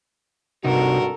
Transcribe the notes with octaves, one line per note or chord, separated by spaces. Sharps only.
G#1 G2 C3 D#4 F#4 A4 A#4